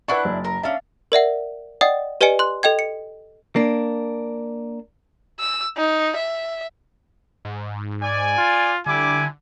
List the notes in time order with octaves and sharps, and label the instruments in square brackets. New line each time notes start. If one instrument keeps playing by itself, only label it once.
[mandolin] D4 E4 F#6 [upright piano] B4 F#5 C#6
[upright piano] F#1
[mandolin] A#4
[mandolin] C#4 D4 [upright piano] E5 F5
[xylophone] A#4 D5 E5 F#5
D5 D#5 F#5 G5 D#6 A6
G4 B4 D5 D#5 G#5 C#7
C6 F#6
A4 D#5 G5 G#6
C#7
[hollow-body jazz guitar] A#3 D4
[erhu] E6
D#4
E5
[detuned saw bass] G#2
[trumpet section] D5 G#5
[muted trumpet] F4
[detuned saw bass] D3 [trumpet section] G3 E4 D6 [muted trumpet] G#5